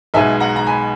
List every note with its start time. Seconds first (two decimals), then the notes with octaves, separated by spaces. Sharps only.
0.14 B1 B2 G#3 E5 G#5
0.40 F#5 A#5
0.56 A#5
0.67 G#5 B5